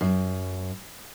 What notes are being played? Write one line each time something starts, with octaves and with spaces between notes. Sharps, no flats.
F#2